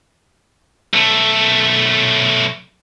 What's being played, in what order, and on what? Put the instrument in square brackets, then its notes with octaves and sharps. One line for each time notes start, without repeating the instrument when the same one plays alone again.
[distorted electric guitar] B1 A3